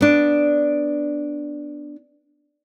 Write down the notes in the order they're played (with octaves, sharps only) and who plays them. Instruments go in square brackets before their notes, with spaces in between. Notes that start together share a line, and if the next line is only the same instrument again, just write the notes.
[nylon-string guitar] B3 D4